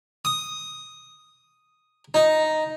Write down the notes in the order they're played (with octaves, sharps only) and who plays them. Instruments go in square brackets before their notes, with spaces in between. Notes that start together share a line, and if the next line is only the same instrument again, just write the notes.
[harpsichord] D#6
D#4